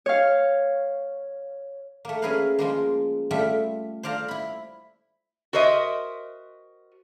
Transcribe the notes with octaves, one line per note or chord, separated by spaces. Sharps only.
C#5 F5
A3 A#3
C#4 E4 G#4 A#4 B4 F5
F3 G#3 A#3
G3 A3 F4 E5
C5 D5 F5 A5 A#5
E4 B5
F#4 A#4 C5 C#5 D#5 E5